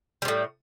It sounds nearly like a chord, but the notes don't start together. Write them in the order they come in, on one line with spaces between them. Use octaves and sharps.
G3 C3 A2